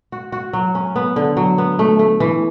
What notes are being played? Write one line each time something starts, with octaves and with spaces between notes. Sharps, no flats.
F#4
F#4
F#3
C#4
B3
D3
F#3
B3
A3
A3
E3